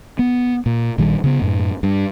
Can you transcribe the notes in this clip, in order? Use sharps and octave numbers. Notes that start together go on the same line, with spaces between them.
B3
A#2
A#1 D#3 G3
C#3 B3
F#2 A2
G2